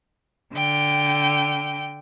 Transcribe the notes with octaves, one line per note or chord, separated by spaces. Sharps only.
D3 G5